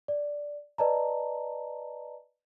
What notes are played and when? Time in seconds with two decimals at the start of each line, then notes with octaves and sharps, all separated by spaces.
0.08 D5
0.78 B4 D5 D#5 A5 A#5